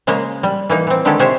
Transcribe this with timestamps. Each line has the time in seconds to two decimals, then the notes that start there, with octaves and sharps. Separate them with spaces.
0.07 C#3 G#3 A#3 C5 A#5
0.43 G3
0.69 E3 A#3 D#4
0.87 E3 C4
1.05 D3 D#3 G#3 E4 G4 A4
1.19 C3 G#3 G4 C5 C#5 E5